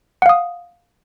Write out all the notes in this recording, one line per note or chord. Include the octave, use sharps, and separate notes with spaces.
F5 F#5 D#6